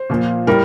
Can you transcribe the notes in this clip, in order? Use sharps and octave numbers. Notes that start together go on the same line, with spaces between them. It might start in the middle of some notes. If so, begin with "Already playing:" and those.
Already playing: C5
A#2 F3 A#3
A2 G3 A#4